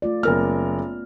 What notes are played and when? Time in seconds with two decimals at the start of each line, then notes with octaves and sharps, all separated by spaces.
0.02 A3 F4 D5
0.23 F#1 B3 A#4 F6